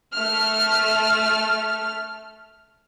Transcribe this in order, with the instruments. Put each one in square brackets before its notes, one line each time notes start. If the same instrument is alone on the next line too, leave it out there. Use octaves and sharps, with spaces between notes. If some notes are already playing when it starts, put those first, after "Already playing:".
[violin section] A3 F6